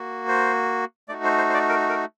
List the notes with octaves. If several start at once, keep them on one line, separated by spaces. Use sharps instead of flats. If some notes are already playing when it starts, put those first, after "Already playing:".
Already playing: A#3 F#4
C5
A3 D#4 F#4 D5
C5
C5
C5
D5
A#4
A#4